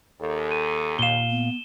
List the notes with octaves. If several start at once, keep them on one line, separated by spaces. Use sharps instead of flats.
D#2 A4
D#7
A#2 F5 E7 G7
B3